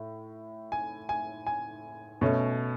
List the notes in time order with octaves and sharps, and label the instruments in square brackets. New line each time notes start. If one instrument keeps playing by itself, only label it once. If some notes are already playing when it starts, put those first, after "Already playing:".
Already playing: [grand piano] A2
G#5
G#5
G#5
B2 A3 C#4